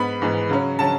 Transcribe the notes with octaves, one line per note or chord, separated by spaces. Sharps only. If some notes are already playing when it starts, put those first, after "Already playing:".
Already playing: G#2 B3 B5
G#2 E3 B3
C#3 F#3 C#4
C#3 F#3 C#4 A5